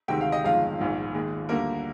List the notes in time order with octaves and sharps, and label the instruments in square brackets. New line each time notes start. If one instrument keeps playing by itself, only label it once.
[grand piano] D2 C3 D#3 G#3 G5
F5
D#5
G1 F2 D#3 G#3 F4 F5
A#1 G#2 D#3
D#2 D#3 G#3
D2 D3 G3 A#3 A#4